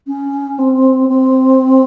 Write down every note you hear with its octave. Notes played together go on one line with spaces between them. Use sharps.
C#4
C4
C4